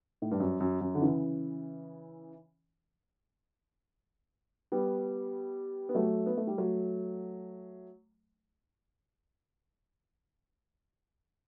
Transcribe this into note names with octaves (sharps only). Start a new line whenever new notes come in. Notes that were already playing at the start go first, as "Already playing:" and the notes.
A2
G2
F#2
F#2
F#2
D3
C#3 E3
G3 B3
B3
F#3 A3
B3
A3
G3
F#3 A3